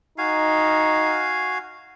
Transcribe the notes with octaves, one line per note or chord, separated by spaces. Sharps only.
D#4 F#4 F5 G#5